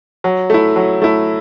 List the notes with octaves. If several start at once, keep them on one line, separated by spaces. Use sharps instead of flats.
F#3
A3 E4
F#3
A3 E4